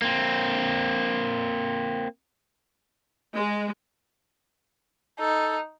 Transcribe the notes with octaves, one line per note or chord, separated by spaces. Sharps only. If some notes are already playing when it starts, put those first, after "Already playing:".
A#3 C4
G#3
D#4 A4